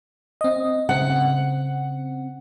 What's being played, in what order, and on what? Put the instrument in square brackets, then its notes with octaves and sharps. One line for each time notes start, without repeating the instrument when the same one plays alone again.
[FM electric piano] C4 D#5
[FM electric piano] C#3 C4 [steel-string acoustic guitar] F#5